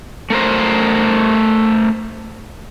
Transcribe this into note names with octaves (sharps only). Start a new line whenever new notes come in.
A3 A#4 C5